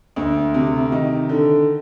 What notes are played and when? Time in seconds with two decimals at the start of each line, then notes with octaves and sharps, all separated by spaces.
0.16 D2
0.54 C3
0.92 D#3
1.29 D3